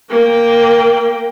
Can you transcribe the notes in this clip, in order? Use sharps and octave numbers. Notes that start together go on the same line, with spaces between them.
A#3 G5